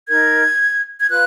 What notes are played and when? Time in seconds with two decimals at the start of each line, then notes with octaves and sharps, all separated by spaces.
0.08 D#4 A#4 G#6
0.98 G#6
1.09 F4 B4 F#6